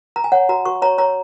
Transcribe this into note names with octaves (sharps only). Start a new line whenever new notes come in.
A#5
G#5
C#5 F#5
F#4 A#5
F#4 C#6
C#5 A#5
C#5 A#5